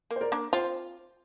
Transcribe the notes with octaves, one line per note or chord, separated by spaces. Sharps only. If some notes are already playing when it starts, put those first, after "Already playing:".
A#3
C5
A#4 D5
A#3 D4
C4 F4 C5